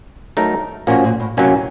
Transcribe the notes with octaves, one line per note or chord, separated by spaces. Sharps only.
F#3 A3 D#4 A#4
A#2 F3 A#3 C#4 F#4
A#2
A2
A2 C3 F#3 A#3 C#4